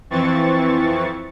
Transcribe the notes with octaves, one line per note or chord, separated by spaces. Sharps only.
F2 E3 C4 C#6 A6